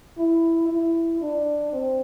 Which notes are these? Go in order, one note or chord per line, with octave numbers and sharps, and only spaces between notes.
E4
E4
D4
C4